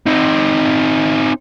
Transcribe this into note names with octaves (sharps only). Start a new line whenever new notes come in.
C4 D#4